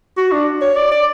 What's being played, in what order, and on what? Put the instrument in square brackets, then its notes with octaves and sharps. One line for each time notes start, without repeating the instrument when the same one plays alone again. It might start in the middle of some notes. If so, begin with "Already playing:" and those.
[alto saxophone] F#4
D4
C#5
D5
D5